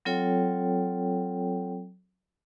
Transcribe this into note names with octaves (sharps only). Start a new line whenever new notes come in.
F#3 C4 F4 A4 C#5 G5